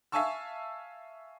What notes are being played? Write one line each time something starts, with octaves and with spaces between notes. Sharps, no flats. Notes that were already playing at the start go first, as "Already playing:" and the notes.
E5 F5 G#5 A5 C#6 E6